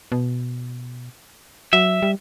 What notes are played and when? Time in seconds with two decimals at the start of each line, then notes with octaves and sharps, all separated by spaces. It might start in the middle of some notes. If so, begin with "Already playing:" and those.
0.12 B2
1.73 F#3 E5
2.03 G3